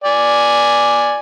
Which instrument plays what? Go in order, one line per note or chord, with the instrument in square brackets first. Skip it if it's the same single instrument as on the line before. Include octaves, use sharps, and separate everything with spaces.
[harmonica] D5 G#5